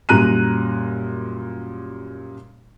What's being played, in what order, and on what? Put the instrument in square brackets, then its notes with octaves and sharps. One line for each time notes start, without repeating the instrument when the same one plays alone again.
[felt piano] F#2 A#2 G3 A#5 F#6 D#7